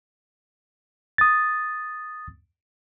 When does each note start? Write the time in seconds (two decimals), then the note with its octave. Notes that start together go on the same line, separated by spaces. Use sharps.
1.18 D#6 A6